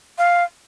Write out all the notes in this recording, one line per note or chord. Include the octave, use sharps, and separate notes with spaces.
F5